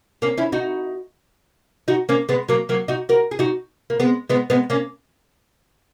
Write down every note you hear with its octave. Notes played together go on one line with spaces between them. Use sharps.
A#3 C#4
C#4 E4
D#4 F#4
D#4 F#4
A#3 C#4
G#3 B3
F#3 A#3
F#3 A#3
D#4 F#4
F#4 A#4
G#4
D#4 F#4
A#3
G#3 B3
G#3 B3
G#3 B3
A#3 C#4